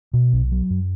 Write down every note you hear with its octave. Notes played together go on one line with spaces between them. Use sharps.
B2
B1
F#3
F#2